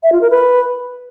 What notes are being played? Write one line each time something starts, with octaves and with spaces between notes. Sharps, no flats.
E5
F4
A#4
B4